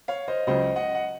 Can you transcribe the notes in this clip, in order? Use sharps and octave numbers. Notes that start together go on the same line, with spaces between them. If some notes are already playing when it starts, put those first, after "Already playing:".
C#5 F5
C5 D#5
C#2 C#3 F#3 C5 D#5
D#5 F#5
F#5